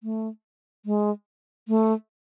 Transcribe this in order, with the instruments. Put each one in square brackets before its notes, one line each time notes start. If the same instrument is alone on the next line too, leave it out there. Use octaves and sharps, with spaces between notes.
[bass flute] A3
G#3
A3